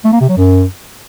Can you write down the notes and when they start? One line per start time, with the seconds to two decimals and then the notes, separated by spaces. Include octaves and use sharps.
0.05 A3
0.13 A#3
0.21 C3
0.29 F#3
0.37 F#2